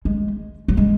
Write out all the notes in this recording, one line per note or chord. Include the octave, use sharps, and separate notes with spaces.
G#3
F#3
G#3